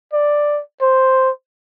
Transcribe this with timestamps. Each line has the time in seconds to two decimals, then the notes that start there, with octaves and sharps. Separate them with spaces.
0.13 D5
0.82 C5